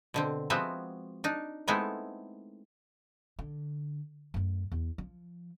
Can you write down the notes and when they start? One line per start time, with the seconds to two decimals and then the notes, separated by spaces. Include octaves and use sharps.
0.14 B2 D3 C4
0.50 F3 G#3 B3 C4 F#4 E5
1.24 D4 D#4
1.68 G#3 A3 B3 C4 D#4 E4
3.39 D3
4.34 F#2 A3
4.72 E2
4.98 F3